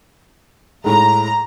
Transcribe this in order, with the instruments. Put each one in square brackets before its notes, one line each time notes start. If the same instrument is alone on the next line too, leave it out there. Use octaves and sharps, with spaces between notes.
[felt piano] A2 G#3 [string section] A#5